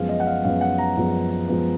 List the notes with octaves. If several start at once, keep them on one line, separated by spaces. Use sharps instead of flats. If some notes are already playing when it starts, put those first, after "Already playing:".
Already playing: F#2 F3 G#3 B3 F5
D#5
F#5
F5
F#2 F3 G#3 B3 F5
F#5
A#5
F#2 F3 G#3 B3
F#2 F3 G#3 B3